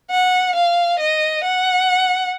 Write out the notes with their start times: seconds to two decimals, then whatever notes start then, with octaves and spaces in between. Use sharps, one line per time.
0.11 F#5
0.56 F5
0.99 D#5
1.44 F#5